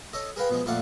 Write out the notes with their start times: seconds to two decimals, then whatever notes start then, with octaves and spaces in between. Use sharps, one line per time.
0.13 A4 C#5 D#5
0.36 G#4 A#4 B4 F5 G5
0.50 B2 F3 G#3
0.65 F2 A#2 A3 D5 F5 F#5